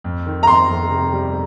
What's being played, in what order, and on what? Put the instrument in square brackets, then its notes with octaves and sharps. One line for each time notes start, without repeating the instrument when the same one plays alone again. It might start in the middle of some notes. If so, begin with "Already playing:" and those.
[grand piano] F2
D#3
[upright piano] A#5
[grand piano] F2 [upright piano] C6
[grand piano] F2
C3
G3